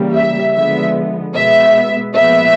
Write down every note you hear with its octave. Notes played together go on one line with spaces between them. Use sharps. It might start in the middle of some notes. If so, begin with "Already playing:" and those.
Already playing: C#3 E3 G3 A#3
E5
D3 F3 G#3 B3 E5
B2 G#3 B3 E5
A#2 F3 G#3 B3 E5